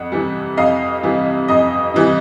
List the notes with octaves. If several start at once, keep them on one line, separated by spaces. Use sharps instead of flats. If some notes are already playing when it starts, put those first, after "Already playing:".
Already playing: F2 F#5
C3 E3 G3
F2 D#5 F5
C3 E3 G3
F2 D#5
C3 E3 G3